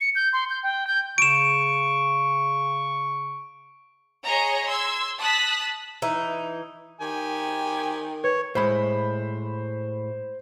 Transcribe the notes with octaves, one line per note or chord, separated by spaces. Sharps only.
C#7
G6
C6
G6
G5
G6
C#3 C#6 D7 E7
G#4 C#5 D#5 A#5
C6 E6 G#6
A5 D#6 F#6 B6
E3 D#4
D#3 G4 G5 G#5
B4 C#5
A2 G#3 C5 B5